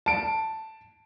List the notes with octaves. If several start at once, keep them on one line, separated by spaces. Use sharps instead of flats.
A5 D7